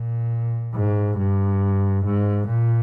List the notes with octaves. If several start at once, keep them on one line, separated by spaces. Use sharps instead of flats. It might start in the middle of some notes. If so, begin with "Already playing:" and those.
Already playing: A#2
G#2
G2
G#2
A#2